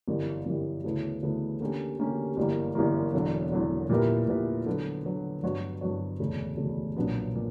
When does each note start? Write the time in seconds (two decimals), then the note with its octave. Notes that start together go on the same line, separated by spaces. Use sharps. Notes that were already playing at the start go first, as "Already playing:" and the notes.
0.08 G1 F#2 E3 G3
0.45 G1 F#2 E3 G3
0.84 D2 C#3 E3 B3
1.23 D2 C#3 E3 B3
1.60 D3 A#3 C#4 G4
1.99 D3 A#3 C#4 G4
2.37 G1 F#2 E3 G3 A#3
2.75 G1 F#2 E3 G3 A#3
3.14 E1 E2 D3 F#3
3.52 E1 E2 D3 F#3
3.89 A#2 G3 B3 E4 A#4
4.28 A#2 G3 B3 E4 A#4
4.66 D3 F#3 B3
5.05 D3 F#3 B3
5.43 G2 F#3 B3 F#4 C#5
5.81 G2 F#3 B3 F#4 C#5
6.19 E1 D2 C#3
6.57 E1 D2 C#3
6.97 B1 A#2 F#3 B3 D4
7.35 A#2